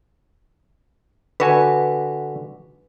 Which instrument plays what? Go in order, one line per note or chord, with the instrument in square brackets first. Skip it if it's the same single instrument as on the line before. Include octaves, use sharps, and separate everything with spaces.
[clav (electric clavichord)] D3 F#4 G#5 [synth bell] B4